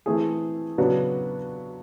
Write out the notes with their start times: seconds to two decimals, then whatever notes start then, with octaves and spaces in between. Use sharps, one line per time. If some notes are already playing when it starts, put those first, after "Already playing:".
0.06 E3 A3 C4 E4 G#4
0.78 C#3 F#3 B3 D4 F#4